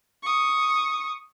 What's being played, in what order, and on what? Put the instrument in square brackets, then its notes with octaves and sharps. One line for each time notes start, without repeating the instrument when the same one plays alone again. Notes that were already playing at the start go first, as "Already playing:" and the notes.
[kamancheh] C#6 D#6